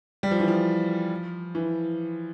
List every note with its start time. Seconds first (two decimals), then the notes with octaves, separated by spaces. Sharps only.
0.23 G3
0.31 F3
0.40 E3
0.48 F3
1.55 E3